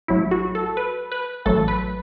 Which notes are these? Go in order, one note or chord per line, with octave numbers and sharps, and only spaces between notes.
A1 A2 F#3 E4
F#4
A4
B4
B4
A1 A2 F#3 A4
B4